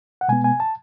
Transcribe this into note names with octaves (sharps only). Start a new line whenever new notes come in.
F#5
B2 G#3 B3 G#5
G#5
A5